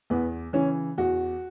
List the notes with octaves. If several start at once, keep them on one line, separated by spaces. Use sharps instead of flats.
E2 B3
C#3 E3 C#4
E2 F#4